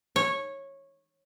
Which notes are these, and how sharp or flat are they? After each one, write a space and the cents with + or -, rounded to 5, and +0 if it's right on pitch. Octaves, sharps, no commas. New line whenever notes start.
C#5 -15